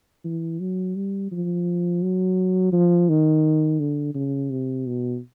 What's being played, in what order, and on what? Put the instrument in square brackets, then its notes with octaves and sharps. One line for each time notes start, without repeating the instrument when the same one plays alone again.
[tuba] E3
F#3
G3
F3
F#3
F3
D#3
D3
C#3
C3
B2